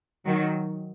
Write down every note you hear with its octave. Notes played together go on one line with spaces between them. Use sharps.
D#3 F#3